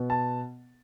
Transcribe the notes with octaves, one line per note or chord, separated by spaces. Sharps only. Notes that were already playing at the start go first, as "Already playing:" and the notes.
Already playing: B2 B3
A5